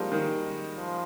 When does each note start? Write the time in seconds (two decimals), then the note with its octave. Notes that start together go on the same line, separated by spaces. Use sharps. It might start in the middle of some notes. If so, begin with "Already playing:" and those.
Already playing: F3 G3 G#3 A#3 D#4
0.12 D#3
0.75 F3